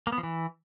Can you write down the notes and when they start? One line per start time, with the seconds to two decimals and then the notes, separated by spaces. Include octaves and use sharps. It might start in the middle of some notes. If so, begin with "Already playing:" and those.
0.07 A#3
0.12 B3
0.18 F3
0.23 E3